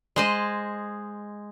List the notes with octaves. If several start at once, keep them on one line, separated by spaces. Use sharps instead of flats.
G#3 C5 D#5